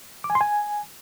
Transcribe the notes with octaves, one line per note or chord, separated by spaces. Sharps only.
D6
G#5
C6
G#5